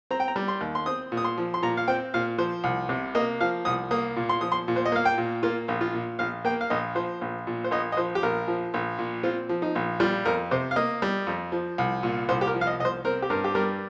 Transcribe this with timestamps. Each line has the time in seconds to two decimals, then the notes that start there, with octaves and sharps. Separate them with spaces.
0.11 C4 A#5
0.20 G5
0.28 A#5
0.36 G3
0.48 C6
0.61 D#2
0.75 C6
0.86 C4 D#6
1.12 A#2
1.17 D#6
1.25 C6
1.38 F3
1.54 C6
1.62 A#2 A#5
1.77 F5
1.88 C4 G5
2.14 A#2 F5
2.38 F3 C5
2.64 C2
2.89 C3
3.15 A#3 D#5
3.41 F3 F5
3.65 C2 D#6
3.91 A#3 D#6
4.16 A#2
4.29 C6
4.41 F3 D#6
4.52 C6
4.68 A#2
4.76 C5
4.86 D#5
4.92 A#3 F5
5.05 G5
5.18 A#2
5.43 A#3 F4
5.68 A#1
5.81 F4
5.94 A#2
6.19 A#1 F5
6.45 A#3 G5
6.61 F5
6.70 A#1 D#5
6.95 F3 C5
7.21 A#1
7.47 A#2
7.64 C5
7.71 A#1 D#5
7.92 D#5
7.97 F3 C5
8.15 G4
8.23 A#1 A#4
8.48 F3
8.74 A#1
8.99 A#2
9.23 C4 F4
9.49 F3
9.62 D#4
9.75 A#1
10.00 G3 F4
10.25 F2 A#4
10.51 C3 C5
10.71 F5
10.76 A#3 D#5
11.02 G3
11.27 F2
11.52 F3
11.78 C2
12.03 A#2
12.29 C2 C5
12.41 G4
12.47 A#4
12.54 F3
12.61 F5
12.67 D#5
12.80 C2 D#5
12.85 C5
13.05 C4 A#4
13.22 G4
13.30 G2 A#4
13.44 G4
13.55 G3 A#4